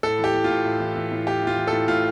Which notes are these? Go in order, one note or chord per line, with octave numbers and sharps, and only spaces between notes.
A2 A4
E3 G4
E3
F4
A2
A2
E3
E3
A2
A2 G4
E3 F4
E3
A2 A4
A2 F4